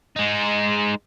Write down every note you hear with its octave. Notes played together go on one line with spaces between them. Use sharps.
G#3 D#4